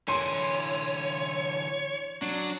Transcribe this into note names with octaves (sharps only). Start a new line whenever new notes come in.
D3 E3 C#5 C6
F#3 D4